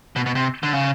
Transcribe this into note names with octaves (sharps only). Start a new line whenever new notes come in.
B2
B2
C3
D3
C#3